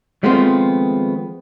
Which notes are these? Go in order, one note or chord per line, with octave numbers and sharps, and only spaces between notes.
D#3 F3 G#3 A3 B3 C4